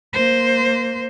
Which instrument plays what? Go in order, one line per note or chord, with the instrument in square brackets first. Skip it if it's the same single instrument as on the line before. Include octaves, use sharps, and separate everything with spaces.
[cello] A#3 C5